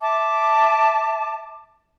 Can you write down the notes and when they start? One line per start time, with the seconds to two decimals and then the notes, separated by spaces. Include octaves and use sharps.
0.02 E5 A5 D6